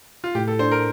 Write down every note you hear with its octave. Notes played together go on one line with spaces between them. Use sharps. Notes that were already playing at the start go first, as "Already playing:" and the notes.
F4
A2 G4
A4
D4 C5
A#4